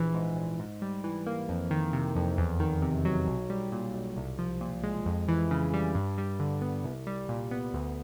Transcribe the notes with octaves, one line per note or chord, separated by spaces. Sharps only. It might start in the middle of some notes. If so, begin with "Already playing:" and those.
Already playing: A#1 E3
G#2
A#1
G#2
G3
E3
A#3
F2
D#3
C3
F2
E2
D#3
C3
F#3
B1
G3
A#2
B1
C2
F3
A#2
G#3
F2
E3
C#3
G3
G2
G3
D3
B3
C2
G3
A#2
B3
D2